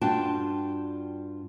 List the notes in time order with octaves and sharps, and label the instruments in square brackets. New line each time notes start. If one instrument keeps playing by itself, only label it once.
[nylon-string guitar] G2 D4 F4 F#4 G5 A5